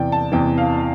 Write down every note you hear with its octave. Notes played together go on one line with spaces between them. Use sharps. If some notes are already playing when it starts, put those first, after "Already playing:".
Already playing: E2 C3 E3 D5 G5
A5
E2 C3 E3 G5
F5